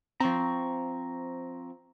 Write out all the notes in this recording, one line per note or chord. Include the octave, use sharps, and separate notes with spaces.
F3 C4 A#5 C#6